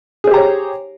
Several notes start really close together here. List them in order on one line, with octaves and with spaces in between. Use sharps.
G#4 C5 G4 A#5 C#5